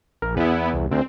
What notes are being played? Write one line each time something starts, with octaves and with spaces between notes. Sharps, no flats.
A#1 A#4
E2 B3 E4
C2
D2 C4